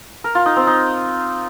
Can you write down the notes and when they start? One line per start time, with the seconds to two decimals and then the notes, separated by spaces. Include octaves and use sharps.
0.24 A#4
0.35 F4
0.46 D#4
0.56 C4
0.67 D#4